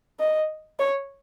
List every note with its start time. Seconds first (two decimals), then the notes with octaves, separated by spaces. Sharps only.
0.19 D#5
0.79 C#5